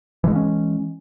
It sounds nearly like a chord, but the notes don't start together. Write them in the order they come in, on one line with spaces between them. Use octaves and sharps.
E3 G#3 A#3 C#4